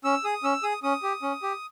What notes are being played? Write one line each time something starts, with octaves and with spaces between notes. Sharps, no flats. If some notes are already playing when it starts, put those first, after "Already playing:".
C#4 E6
G#4 D#6
C#4 E6
G#4 D#6
C#4 D#6
G4
C#4
G4